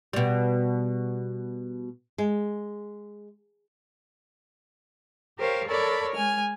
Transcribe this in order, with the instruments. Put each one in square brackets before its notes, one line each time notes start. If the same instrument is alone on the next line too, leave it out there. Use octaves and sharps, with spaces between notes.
[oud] B2 G3
[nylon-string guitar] G#3
[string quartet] G4 A#4 C5 C#5 F5
A4 A#4 C#5 D5 B5
G#3 G#5 F6